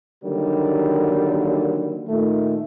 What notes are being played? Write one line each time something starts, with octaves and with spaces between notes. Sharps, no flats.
D3 D#3 F#3 G3 A#3
A#2 D#3 A3